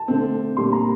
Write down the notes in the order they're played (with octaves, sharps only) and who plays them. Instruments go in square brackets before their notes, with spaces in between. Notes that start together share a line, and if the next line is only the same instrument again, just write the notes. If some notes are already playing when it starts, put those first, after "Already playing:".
Already playing: [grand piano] A5
D3 A3 C4
A#2 G3 C4 C6
A#5